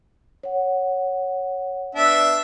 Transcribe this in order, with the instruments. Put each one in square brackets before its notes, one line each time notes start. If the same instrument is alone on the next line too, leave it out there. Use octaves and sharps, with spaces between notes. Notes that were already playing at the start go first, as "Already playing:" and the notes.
[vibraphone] C#5 F#5
[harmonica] B3 D4 E5